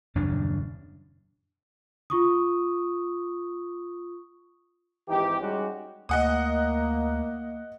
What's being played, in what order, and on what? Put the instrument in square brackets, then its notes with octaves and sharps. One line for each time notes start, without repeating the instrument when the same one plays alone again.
[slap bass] D#1 F#2 C#3 D4
[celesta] F4 C#6 D#6
[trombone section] G#1 E3 D#4 G4
G3 G#3 C#4 D#4 F#4 G4
[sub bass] D2 [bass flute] A#3 [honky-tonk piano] D#5 F#5 D#6